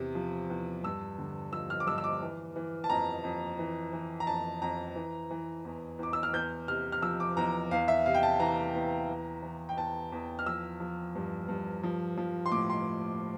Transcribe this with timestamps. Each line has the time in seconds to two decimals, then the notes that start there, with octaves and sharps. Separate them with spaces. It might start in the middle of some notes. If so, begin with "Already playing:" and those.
Already playing: E2 C3
0.15 F3
0.50 E2
0.84 G2 E6
1.18 D3
1.52 F3 E6
1.70 F6
1.80 D6
1.86 G2 E6
1.98 E6
2.04 D6
2.22 E3
2.56 E3
2.84 A5
2.90 F2 A#5
3.24 F2
3.59 E3
3.93 E3
4.20 A#5
4.27 F2 A5
4.62 F2 A#5
4.96 E3
5.31 E3
5.65 E2
5.99 E2 D6
6.13 E6
6.23 F6
6.33 E2 G6
6.68 C3 F6
6.92 F6
7.02 F3 E6
7.20 D6
7.37 E2 A#5
7.71 E2 F5
7.88 E5
8.06 C3 F5
8.14 G5
8.23 A5
8.40 E3 A#5
8.75 E2
9.09 E3
9.43 E3
9.69 G5
9.77 E2 A5
10.12 E2
10.39 F6
10.46 F3 E6
10.80 F3
11.15 G2
11.48 G2
11.83 F3
12.17 F3
12.46 C6
12.52 A2 D6
12.70 C6